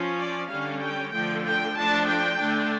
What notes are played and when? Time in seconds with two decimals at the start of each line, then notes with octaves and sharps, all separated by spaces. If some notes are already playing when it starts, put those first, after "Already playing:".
Already playing: F3 C#4
0.19 D5
0.50 D3 G3 C#4 F5
0.81 G5
1.13 D3 F3 A3 G5
1.45 G5
1.76 F3 A3 D4 A5
2.08 G5
2.40 D3 A3 D4